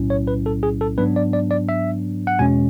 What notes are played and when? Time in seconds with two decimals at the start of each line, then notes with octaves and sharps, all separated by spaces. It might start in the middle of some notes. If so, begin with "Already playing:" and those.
Already playing: B1 A2 F#3 C#4 E4
0.10 C#5
0.27 B4
0.46 A4
0.63 G#4
0.81 A4
0.98 G#2 F#3 B3 D4 B4
1.16 D5
1.33 D5
1.51 D5
1.69 E5
2.27 F#5
2.39 E2 B2 G#3 C#4 G#5